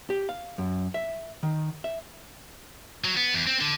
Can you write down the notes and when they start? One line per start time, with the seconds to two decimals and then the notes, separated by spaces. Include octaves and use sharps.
0.10 G4
0.29 F5
0.58 F#2
0.94 E5
1.43 D#3
1.84 E5
3.04 F#3
3.17 B3
3.34 E2
3.47 C4
3.61 D3